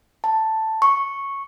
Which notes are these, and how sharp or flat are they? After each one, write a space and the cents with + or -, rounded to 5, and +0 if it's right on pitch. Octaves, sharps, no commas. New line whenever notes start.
A5 +5
C#6 -5